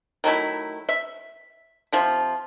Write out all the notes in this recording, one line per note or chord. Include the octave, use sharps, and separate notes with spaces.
D#3 F#3 A3 E4
E5
C3 F3 F4